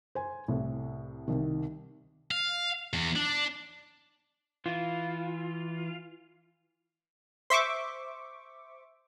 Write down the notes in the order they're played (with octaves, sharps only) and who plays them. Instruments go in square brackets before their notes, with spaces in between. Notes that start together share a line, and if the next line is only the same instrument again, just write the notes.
[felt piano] C5 G#5
C2 A2
C2 D#3
[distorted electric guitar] F5
E2
D4
[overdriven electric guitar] E3 [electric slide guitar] F4
[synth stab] C5 E5 C#6 D6